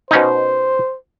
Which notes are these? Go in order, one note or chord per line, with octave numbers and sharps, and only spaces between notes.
B2 C#4 D#4 C5